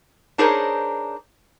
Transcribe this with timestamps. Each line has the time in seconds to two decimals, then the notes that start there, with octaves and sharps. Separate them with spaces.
0.38 D4 D#4 G#4 A#4 C5 C#5